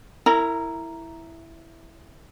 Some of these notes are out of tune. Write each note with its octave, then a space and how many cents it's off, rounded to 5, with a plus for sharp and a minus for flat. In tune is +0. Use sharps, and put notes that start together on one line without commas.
E4 +0 A#4 -30 A#5 +0